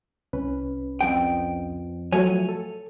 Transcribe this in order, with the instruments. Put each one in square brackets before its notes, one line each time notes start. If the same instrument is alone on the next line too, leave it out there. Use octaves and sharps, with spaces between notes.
[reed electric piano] C2 C#4 B4
[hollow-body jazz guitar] F2 G5
[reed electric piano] F3 F#3 A3 [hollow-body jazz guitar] C#5 G#5
[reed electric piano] A4